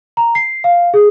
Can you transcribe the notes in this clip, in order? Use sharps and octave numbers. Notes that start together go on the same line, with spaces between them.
A#5
C7
F5
G#4